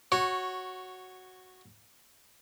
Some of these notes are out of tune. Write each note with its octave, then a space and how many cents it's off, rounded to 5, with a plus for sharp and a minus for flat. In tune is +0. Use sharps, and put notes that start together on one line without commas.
F#4 +0 C#5 -10